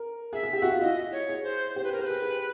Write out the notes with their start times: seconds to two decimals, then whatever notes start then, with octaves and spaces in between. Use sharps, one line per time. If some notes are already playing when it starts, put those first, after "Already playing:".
Already playing: A#4
0.33 G#4 E5
0.43 G#4
0.53 G4
0.62 F#4
0.71 F4
0.80 E4 D#5
1.12 C#5
1.29 G#4
1.43 C5
1.76 G4 C5
1.84 B4
1.88 G#4 A#4
1.99 G4 C5
2.06 G#4 B4
2.22 G4